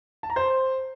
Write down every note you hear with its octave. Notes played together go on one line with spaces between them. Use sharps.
A5
A#5
C5